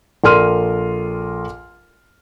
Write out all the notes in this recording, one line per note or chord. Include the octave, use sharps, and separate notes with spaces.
A#1 A4 A#4 C6 F6 D#7